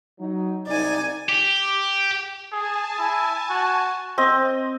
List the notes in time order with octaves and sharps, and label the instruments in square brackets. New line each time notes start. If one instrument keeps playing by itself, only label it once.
[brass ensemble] F#3 D#4
[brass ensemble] C2 D#4 [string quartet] D5 G#5
[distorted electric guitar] G4
[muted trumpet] G#4 [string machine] G#5 A5
[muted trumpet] E4
F#4
[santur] C4 D#5